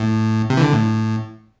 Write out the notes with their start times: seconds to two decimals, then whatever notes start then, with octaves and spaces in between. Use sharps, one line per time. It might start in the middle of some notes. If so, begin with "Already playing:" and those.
Already playing: A2
0.50 C3
0.57 E3
0.62 D3
0.73 A2